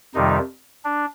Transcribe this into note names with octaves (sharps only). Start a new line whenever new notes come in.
F2 C3 D#3 G3 D#4
D4